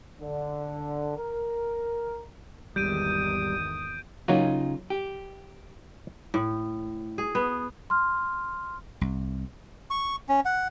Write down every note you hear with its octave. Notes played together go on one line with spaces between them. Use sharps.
D3
A#4
G#1 E2 D#3 G3 D#6 G6 D7 D#7
C#3 F#3 A#3 D#4 F4 F#4
G4
A2
G#4
B3
C6 F6
C2
C#6
C#4
F#5